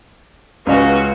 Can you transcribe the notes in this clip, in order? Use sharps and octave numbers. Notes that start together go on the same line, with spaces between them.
C#2 F#3 G#3 C#4 F#4 B4 D#5 F5